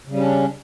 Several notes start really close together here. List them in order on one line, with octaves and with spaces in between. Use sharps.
C#3 G3 C#4 D4